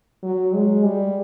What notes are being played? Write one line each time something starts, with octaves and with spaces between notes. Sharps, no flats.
F#3
G#3
G3